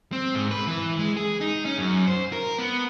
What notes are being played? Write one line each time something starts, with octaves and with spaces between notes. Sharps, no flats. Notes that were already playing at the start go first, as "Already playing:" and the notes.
C4
G#2
B4
E3
G#3
G#4
D#4
C#4
F#2
C5
A#4
B3